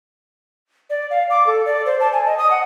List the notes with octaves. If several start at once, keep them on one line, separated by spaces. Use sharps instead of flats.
D5
F5
D6
A4
D5
C5
A5
G#5
D#5
D#6
F#5